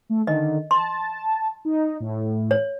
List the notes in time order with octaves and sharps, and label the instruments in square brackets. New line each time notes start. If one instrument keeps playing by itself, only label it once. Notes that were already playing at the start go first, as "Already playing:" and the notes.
[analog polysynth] A3
[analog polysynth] D3 D#3 [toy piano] D#5
[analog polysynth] A5 [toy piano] C6
[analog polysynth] D#4
A2
[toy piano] C#5